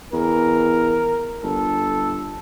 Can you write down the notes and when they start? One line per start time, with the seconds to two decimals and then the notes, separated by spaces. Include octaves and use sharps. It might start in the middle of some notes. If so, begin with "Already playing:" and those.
0.13 E2 A#4
1.43 G1 A4